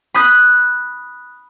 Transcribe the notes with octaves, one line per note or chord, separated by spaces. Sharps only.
B5 D#6 F#6 G6 B6